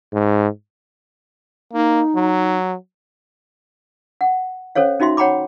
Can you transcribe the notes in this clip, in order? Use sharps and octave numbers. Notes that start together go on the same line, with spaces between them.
G#2
A#3 D#4
F#3
F#5
C#4 A4 C5 C#5 F5
C#4 D#4 F#4 E5 C6
C#5 F#5 G5 A#5 B5 D6